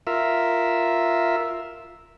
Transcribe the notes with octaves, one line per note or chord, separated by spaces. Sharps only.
F4 A#4 E5